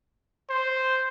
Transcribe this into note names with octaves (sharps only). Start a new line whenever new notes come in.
C5